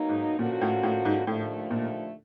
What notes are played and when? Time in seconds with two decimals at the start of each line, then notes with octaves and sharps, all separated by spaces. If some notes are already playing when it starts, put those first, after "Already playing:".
Already playing: B2 F#3 A#3 D#4
0.09 G#2
0.39 A#2 D3 F3 A#3 C#4 F#4
0.61 A2
0.83 A2
1.05 G#2
1.27 D#2 A2 D3 F3 A3
1.71 A#2